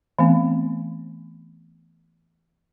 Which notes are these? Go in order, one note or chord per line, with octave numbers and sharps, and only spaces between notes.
E3 A3 B3 C4